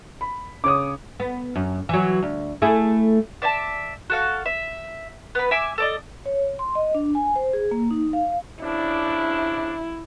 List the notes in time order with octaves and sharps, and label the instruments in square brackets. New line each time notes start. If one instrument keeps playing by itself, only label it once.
[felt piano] B5
[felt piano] C#3 C#5 [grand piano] D6 D#6
[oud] B3
F#2
E3 F#3
D2
A3 E4 G#4
[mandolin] D5 E5 G#5 A5
F#4 A4 F5
E5
B3 B4
E5 G#5 D6 E6
A4 D5 D#5
[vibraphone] C#5
C6
D#5
D4
G#5
C5
G#4
A#3
D#4
F5
[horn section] C#3 F3 D4 [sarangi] E4